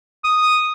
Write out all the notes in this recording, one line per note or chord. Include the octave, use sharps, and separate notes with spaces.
D#6